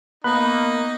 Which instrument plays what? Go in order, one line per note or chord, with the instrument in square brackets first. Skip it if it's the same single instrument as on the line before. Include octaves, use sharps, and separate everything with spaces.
[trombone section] A#3 [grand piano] B3 [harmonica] D#4 [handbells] B5 F#6